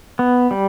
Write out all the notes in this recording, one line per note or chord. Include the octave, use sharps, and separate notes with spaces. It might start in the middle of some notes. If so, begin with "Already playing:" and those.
B3
G3